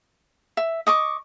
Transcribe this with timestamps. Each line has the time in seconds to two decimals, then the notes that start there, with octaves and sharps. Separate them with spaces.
0.57 E5
0.87 D#5 C#6 D6